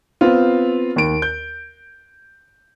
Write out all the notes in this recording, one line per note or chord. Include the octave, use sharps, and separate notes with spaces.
B3 C4 F4
D#2 D7
G6